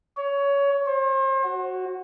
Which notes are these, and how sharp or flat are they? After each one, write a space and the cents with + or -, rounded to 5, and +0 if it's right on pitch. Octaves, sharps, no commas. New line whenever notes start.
C#5 +20
C5 +40
F#4 +0